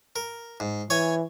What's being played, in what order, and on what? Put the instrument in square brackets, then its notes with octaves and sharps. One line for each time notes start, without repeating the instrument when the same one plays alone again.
[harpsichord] A#4
G#2
[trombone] E3 [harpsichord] C#5 G#5